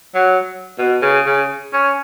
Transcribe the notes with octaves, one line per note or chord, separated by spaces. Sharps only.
F#3
B2
C#3
C#3
C#4